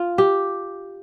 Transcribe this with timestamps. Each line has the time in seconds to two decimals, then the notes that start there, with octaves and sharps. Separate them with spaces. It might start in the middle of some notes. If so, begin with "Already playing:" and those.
Already playing: F4
0.18 G4